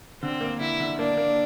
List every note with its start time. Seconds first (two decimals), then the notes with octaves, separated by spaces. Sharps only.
0.22 D3 C4
0.41 A#3
0.60 D3 E4
0.80 D3
0.99 A#3 D4
1.17 A#3